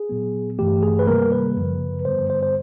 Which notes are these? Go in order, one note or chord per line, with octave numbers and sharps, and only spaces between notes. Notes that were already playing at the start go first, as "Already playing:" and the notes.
Already playing: G#4
A#2 F#3 B3
G2 E3 A3 G4
G#4
B4
C3 D#3 G3 A#3 A#4
B4
F#2 C#3 F3
G2 D3 G3 B3 C5
C5
C5